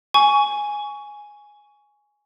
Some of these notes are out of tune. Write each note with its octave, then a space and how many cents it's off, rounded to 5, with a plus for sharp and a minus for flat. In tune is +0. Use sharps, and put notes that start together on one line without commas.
G#5 +0 C#6 +20